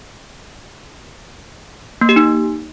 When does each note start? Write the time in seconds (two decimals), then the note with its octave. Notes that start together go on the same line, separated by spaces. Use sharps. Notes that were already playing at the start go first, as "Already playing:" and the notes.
2.01 A#3
2.09 G4
2.16 D#4